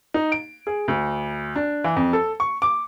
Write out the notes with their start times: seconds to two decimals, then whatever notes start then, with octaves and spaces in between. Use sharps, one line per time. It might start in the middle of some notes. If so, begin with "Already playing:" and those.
0.14 D#4
0.32 D7
0.67 G#4
0.88 D2
1.56 D4
1.84 E3
1.96 F2
2.13 A4
2.40 C#6
2.62 D6